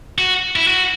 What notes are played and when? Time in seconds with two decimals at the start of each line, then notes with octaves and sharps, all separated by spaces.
0.18 F#4
0.56 E4
0.68 F#4